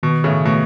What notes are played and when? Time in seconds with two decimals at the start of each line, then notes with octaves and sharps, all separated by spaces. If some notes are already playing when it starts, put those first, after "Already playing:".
0.03 B2 D#3
0.24 A2 C#3
0.45 B2 A3